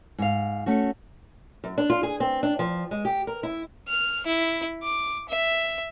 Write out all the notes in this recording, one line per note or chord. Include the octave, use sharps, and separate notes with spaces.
G#2 F5
A3 C#4 F#4
F#2
D4
F4
G#4
C4
D4
F3
G#3
G4
A#4
E4
F6
E4
D6
E5